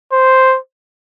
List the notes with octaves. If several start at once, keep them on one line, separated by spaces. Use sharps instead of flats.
C5